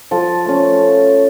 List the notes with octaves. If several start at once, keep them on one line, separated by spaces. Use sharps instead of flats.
F3 A4
A3 C#4